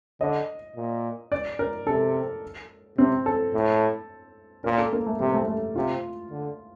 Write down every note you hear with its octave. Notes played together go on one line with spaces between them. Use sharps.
D3 D#5
A#2
D5
A#4
C3 A4
C3 C4
A4
A2
A#2 A#4
A4
A#3
A3
C3 G3
A3
A3
C3 F4
D3